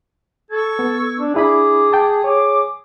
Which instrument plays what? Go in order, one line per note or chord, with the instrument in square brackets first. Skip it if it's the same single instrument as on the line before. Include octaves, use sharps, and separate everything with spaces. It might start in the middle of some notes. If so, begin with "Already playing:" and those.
[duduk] A4 [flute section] C#6 E6 G#6
[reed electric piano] B3
[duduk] D4
[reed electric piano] D4 E4 B5 [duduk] G#4 [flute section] D6
[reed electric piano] G5 A5
[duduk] G#4 [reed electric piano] C#5 [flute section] D6